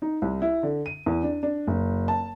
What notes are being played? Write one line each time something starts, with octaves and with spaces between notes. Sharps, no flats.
D#4
C2
E4
D3
D#7
E2
D4
D4
F#1
A5